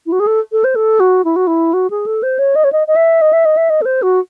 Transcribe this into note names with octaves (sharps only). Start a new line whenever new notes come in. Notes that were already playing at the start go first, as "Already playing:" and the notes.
E4
F#4
G#4
A4
A4
C5
A4
F#4
E4
F#4
E4
F#4
G#4
A4
C5
C#5
D#5
C#5
D#5
D#5
E5
D#5
E5
D#5
E5
D#5
A4
C5
F#4